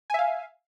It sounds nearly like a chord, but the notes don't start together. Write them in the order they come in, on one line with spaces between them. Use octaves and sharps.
G#5 E5 F5